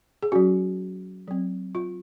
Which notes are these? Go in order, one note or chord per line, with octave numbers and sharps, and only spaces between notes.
G#4
F#3 C#4 F#4
F#3 C4
F4